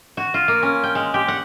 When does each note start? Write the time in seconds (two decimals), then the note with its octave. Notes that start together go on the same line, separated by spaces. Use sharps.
0.17 F#4
0.34 F4
0.48 A#3
0.63 C#4
0.83 G5
0.95 G#3
1.14 G4
1.28 F#5